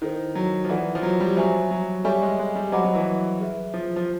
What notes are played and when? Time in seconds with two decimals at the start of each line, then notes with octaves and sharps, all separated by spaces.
0.01 D#3 E4 A4 C5
0.35 F#3
0.64 F3
0.69 E3 E4 A4 D5 F#5
0.95 F3
1.03 F#3
1.20 G3
1.36 F#3 C5 E5 G#5 C#6
1.71 F#3
2.04 G3 A4 C#5 E5 G#5 C#6
2.22 G#3
2.39 G#3
2.55 G3
2.72 F#3 C5 D#5 F#5 B5 D6
2.84 F#3
2.95 E3
3.40 G#4 B4 E5
3.74 F3
3.96 F3